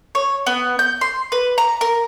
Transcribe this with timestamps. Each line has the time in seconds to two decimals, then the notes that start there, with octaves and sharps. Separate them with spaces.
0.15 C#5
0.46 B3
0.79 G6
1.01 C6
1.32 B4
1.58 A#5
1.81 A#4